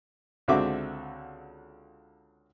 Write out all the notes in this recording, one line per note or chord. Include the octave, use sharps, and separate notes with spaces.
C#2 D3 C4 F#4 E5 D6